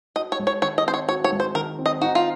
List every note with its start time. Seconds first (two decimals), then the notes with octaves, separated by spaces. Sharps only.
0.16 F#4 D#5
0.32 C#5
0.39 G#3
0.47 C#5
0.62 D#3 C#5
0.78 D#5
0.86 C4 C5
0.94 C#5
1.09 F#4 C#5
1.24 C#5
1.32 G#3
1.40 C5
1.55 D#3 A#4
1.79 C4
1.86 D#5
2.02 D#4 F#4
2.15 F4